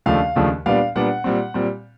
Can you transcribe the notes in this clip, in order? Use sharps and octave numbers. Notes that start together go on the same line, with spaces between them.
D#2 C#3 F3 A3 D4 F5
D#2 C#3 F3 A3 D4
A#2 G3 B3 D4 F5
A#2 G3 B3 D4 F#5
A#2 G3 C4
A#2 G3 C4